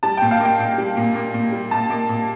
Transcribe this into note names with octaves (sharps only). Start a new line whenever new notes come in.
G3 A5
A#2 G5
F5
A#3
G5
A#2
G3
A#2
A#3
A#2
G3
A#2 A5
A#3
A#2